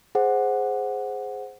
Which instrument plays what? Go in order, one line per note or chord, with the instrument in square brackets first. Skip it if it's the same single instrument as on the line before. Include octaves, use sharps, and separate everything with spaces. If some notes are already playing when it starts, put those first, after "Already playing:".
[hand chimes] G#4 C5 F#5